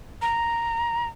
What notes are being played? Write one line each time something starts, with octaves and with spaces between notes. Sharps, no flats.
A#5